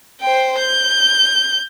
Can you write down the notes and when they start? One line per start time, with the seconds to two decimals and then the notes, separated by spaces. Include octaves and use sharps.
0.21 C5 G5
0.58 G6